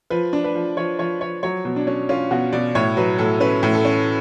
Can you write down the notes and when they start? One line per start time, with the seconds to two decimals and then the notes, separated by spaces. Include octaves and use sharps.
0.10 F3 B4
0.33 D4
0.44 B4
0.55 F3
0.77 F3 C#5
0.99 F3 C#5
1.20 F3 C#5
1.43 F#3 C#5
1.65 B2
1.76 D4
1.87 C#4
2.09 C#4 F4
2.31 B2 F#4
2.53 B2 D5
2.75 A2 C#5
2.97 F#3 B4
3.18 A2 A4
3.40 C#4 B4
3.63 A2
3.74 A4
3.85 C#4